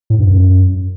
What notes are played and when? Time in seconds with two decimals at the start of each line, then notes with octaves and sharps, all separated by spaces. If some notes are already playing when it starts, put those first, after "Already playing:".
0.10 A2
0.19 G2
0.28 F#2